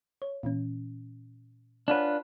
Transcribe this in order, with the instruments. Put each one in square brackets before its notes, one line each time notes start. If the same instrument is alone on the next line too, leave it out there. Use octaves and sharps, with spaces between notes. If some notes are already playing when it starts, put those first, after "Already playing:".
[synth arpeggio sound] C#5
A#2 E3 C#4
[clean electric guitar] D4 F4 B4 [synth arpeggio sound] C#5 F#5 G#5